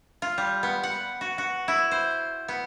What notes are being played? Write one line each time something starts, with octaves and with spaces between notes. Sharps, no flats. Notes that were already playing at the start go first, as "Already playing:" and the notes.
F4
G3
B3
F#5
F#4
F#4
E4
C5
B3